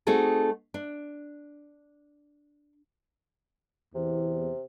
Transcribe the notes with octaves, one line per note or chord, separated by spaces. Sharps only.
A3 C4 D#4 F#4 G#4 A4
D4
E2 C3